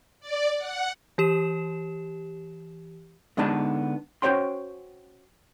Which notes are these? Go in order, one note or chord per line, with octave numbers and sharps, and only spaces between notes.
D5
F#5
E3 G4 E7
D3 G#3 B3 D4 D#4 A5
C#4 F#4 C5 C#5 G5 C6